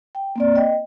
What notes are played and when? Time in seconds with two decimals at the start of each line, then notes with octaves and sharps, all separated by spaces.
0.15 G5
0.36 A#3 C4 D5
0.55 D#5 G5